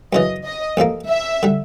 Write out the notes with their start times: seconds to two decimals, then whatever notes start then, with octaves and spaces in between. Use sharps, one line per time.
0.13 F#2 C#3 E3 D#5
0.46 D#5
0.77 A1 A2 F3 A#3
1.09 E5
1.43 D3 G3